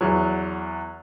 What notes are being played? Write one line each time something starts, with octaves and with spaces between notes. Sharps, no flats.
E2 F#3